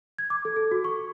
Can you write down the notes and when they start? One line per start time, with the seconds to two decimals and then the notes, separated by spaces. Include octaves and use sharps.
0.18 G#6
0.30 D6
0.45 A4
0.56 A4
0.71 F#4
0.84 C#6